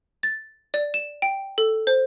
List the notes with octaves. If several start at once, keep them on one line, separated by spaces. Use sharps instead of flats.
A6
D5
E7
G5
A4
C5